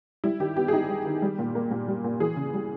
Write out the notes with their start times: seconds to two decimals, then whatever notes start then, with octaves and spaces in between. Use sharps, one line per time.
0.24 G3 E4
0.40 D#3 G4
0.56 B3 G4
0.68 G#4
0.73 D#4 G4
0.89 G3
1.05 D#3
1.22 G3
1.39 A#2
1.55 A#3
1.71 A#2
1.88 G3
2.04 A#2
2.20 E3 G#4
2.36 C#3
2.54 G3